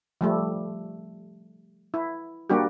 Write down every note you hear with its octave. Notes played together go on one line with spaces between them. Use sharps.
F3 G3 A3
E4
G3 A#3 D4 F#4 G4